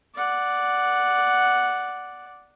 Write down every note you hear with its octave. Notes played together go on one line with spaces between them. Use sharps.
D5 F#5